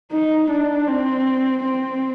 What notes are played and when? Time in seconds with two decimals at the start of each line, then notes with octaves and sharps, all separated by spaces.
0.12 D#4
0.51 D4
0.88 C4
1.64 C4